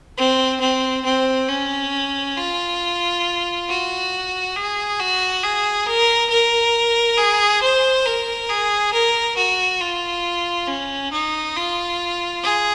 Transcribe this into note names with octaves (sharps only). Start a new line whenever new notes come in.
C4
C4
C4
C#4
F4
F#4
G#4
F#4
G#4
A#4
A#4
G#4
C5
A#4
G#4
A#4
F#4
F4
C#4
D#4
F4
G#4